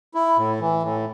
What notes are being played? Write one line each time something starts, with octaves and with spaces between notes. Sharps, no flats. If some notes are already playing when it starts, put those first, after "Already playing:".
E4
A2
E3
A2